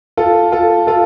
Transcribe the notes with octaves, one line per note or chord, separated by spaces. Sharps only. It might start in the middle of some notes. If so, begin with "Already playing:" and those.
F4 A4
F4 A4
F4 A4